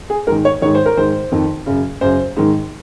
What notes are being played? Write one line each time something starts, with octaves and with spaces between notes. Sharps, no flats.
G#4
G#2 D#3 A#4
C#5
G#2 D#3 C#5
C5
A#4
G#2 D#3 C5
F2 D#3
F#2 C#3
F#2 C#3 C5
G#2 D#3